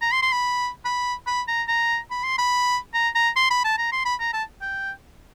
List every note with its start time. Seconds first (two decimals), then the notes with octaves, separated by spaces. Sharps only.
0.02 A#5
0.12 C6
0.22 C6
0.32 B5
0.85 B5
1.27 B5
1.48 A#5
1.68 A#5
2.11 B5
2.24 C6
2.38 B5
2.94 A#5
3.15 A#5
3.36 C6
3.50 B5
3.64 A5
3.78 A#5
3.92 C6
4.05 B5
4.20 A#5
4.33 A5
4.62 G5